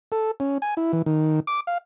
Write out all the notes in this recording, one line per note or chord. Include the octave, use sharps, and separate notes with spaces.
A4
C#4
G#5
E4
E3
D#3
D6
F5